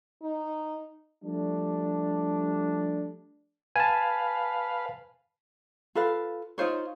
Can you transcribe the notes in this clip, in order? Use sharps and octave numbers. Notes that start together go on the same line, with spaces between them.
D#4
F3 G3 A3 D4
B4 F5 G#5 A5
F4 A4 B4 F5
D#4 F4 C5 C#5